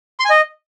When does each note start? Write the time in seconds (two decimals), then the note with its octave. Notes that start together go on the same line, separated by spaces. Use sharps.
0.20 C6
0.25 G#5
0.30 D#5